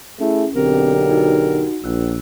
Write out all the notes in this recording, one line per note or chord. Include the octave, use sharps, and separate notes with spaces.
A3 C#4 E4 G#4
B1 D3 C4 G4 A#4
D#4 F#4
A#1 E6 F#6